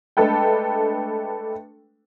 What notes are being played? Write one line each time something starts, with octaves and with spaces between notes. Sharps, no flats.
G#3 A3 D4 A4 B4 G5